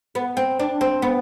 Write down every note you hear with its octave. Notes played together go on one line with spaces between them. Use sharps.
B3
C4
D4
C4
B3